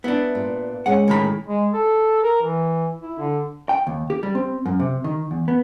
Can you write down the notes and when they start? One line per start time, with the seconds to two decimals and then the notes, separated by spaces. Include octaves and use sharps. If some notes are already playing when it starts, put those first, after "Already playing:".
0.04 B3 D4 E4
0.35 A#2
0.86 G#3 C#4 F#5
1.08 A2 D#3 B5
1.47 G#3
1.73 A4
2.23 A#4
2.42 E3
3.02 E4
3.18 D3
3.69 G5
3.87 D#2
4.10 G4
4.23 G3
4.35 C4
4.66 F#2
4.80 C3
5.04 D#3
5.31 E2
5.48 B3